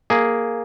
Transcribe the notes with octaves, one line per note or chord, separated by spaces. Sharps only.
A#3 G#4